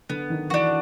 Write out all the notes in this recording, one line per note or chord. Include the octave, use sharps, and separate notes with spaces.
D3 B3
D#3
E3 D4 F#4